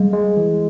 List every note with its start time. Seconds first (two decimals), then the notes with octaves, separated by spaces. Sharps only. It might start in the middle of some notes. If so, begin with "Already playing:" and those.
Already playing: G3 G#3
0.13 G#3
0.37 E3